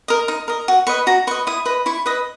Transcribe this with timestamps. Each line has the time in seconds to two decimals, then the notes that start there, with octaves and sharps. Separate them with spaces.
0.08 A#4 D#5
0.28 D#4
0.48 A#4 D#5
0.68 F#4
0.87 B4 D#5 C#6
1.07 F#4 A#5
1.27 B4 C#6
1.31 D#5
1.47 E4 D#6
1.66 B4 D#5
1.86 E4 C#6
2.06 B4 D#5 D#6